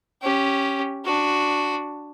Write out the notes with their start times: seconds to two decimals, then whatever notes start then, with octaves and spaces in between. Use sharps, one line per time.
0.23 C#4 G4
1.05 D4 F#4